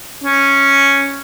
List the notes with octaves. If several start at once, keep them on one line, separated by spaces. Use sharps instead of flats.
C#4